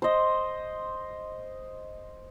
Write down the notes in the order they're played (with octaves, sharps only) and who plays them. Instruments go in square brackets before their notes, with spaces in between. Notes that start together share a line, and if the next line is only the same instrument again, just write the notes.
[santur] C5 D#5